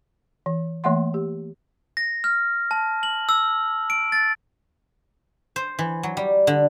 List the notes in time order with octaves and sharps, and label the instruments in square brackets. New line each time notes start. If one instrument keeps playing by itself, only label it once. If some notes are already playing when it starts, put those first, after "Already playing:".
[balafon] E3
E3 A3 A#3 E5 F#5 C6
G4
[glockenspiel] A#6
F6
A5
F#7
E6
D7
A6
[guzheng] C5
E3
F#3
G3
D3